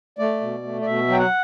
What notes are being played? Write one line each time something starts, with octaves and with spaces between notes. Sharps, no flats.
A3 D5
B2
A3
D5
B2 E5
F#3 G5
F#5